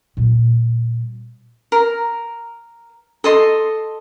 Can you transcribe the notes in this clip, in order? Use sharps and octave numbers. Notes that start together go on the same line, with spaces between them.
A#2 G3
A#4
A4 D#5 C6